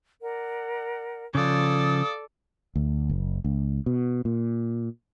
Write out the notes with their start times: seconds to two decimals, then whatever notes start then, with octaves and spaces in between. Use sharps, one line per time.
0.22 A#4 D5 F#5
1.35 C#3 F3 A4 D5 F5 D#6
2.76 D2
3.09 F#1
3.44 C#2
3.86 B2
4.25 A#2